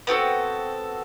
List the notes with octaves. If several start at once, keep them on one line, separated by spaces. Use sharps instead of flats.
B3 C4 F#4 A4